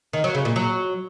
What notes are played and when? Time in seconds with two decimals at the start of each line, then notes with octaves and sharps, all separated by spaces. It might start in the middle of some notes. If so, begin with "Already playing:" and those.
0.13 D#3
0.24 F#3
0.35 C#3
0.45 A#2
0.56 F#3